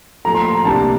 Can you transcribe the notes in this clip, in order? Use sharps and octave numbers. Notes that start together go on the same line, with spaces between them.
A#2 F3 A3 A#5
C6
C6
A#5
C2 C3 G3 A#3 D4 A5